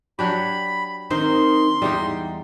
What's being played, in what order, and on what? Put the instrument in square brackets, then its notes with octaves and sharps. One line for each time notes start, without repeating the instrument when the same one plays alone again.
[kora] F#3 D4 G4 [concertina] B5
[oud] D#3 C4 D#4 [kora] C5 [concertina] C6
[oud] E2 G#3 D#4 [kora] G3 G4